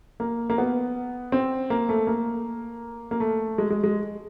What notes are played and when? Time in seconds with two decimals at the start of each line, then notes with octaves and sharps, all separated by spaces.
0.20 A#3
0.50 A#3
0.58 B3
1.32 C4
1.70 A#3
1.89 A3
2.07 A#3
3.11 A#3
3.20 A3
3.58 G#3
3.70 G#3
3.83 G#3